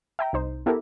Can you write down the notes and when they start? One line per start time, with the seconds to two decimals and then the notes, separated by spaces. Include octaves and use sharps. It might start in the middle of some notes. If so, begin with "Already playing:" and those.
0.19 E5 G5 A#5
0.33 C2 D#4 C5
0.66 B3 E4 G4 A4 A#4